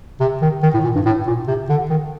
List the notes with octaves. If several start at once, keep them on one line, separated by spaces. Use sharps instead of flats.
C3
D#3
D#3
A2
A#2
G2
A2
A#2
C3
D3
D#3